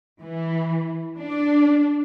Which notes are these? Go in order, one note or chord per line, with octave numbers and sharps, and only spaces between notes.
E3
D4